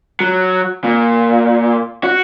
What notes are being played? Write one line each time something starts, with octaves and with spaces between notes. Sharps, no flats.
F#3
A#2
F#4